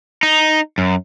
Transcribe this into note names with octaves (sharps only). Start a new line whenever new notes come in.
D#4
F#2